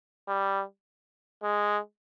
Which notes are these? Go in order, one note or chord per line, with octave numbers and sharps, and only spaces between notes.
G3
G#3